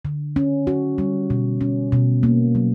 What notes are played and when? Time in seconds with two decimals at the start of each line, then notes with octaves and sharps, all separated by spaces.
0.05 D3
0.36 C#4
0.67 F#4
0.98 G3
1.30 B2
1.61 C#4
1.92 B2
2.23 A#3
2.55 F#3